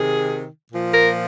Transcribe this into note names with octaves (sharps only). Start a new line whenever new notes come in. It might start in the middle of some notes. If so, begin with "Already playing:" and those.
Already playing: C3 D#3 G#4
A#2 F3
A#4